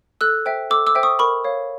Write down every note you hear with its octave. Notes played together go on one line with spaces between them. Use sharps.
A4 E6 F#6
C5 E5 G5
A4 D6 E6
D6 E6
C5 E5 G5
C#6 D#6
A#4 B5 C#6
C#5 F5